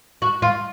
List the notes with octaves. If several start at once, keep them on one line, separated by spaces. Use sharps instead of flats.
F#4
F4